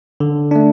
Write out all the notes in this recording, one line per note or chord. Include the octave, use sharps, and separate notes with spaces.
D3
A3 D4